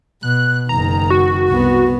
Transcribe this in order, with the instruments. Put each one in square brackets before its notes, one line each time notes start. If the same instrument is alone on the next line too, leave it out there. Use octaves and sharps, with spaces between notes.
[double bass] B2 [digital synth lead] F#6
[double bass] F#1 D#3 [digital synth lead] A#5
[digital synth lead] F#4
[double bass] C2 B3